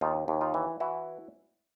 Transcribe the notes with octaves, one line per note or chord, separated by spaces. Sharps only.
D#2 D#4 F4
D#2
D#4 F4
E3
E3 E4 F#4